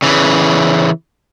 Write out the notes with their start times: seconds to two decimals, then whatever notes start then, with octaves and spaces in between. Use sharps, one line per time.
0.02 C#3 E3